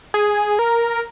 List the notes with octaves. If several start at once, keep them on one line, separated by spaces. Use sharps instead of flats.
G#4
A#4